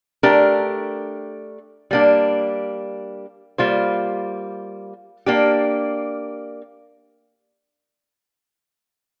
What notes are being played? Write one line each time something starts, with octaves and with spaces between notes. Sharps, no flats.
A3 D4 G4 A#4
G3 A#3 D4
G3 A#3 F4 C5
A#3 D4 G4